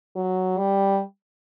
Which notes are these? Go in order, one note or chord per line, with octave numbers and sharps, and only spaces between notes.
F#3
G3